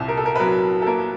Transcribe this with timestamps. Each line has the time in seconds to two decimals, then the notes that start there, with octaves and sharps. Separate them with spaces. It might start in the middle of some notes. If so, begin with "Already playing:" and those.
Already playing: C2 A#2 A4
0.08 A#4
0.17 A4
0.26 A#4
0.35 B4
0.40 F#3 A#4
0.82 A4
0.87 A#3 A#4